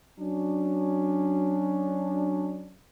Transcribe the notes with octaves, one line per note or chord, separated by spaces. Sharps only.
F#3 C#4 D4